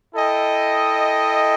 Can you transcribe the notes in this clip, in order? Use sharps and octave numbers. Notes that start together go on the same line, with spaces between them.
E4 A4 D#5 G5